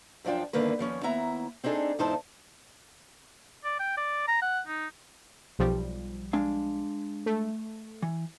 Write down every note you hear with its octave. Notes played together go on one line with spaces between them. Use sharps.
F#2 F3 D4 F4 G5
E2 G2 D3 D#3 A#3 B4
D#2 F3 C#4
D#2 B3 E4 E5 A#5
C4 D4 D#4 G#4 A4
E2 G#2 D#4 E4 C5 A5
D5
G5
D5
A#5
F#5
D#4
B1 F3 G3
G#3 D4 F5
A3
E3